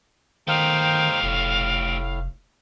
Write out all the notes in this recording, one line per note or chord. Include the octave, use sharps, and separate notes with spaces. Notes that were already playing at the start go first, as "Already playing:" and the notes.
D#3 A3 D#4 G4 C5 F5 G5
F1 A2